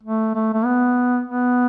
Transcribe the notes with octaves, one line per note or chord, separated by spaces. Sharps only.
A3
A3
A3
B3
B3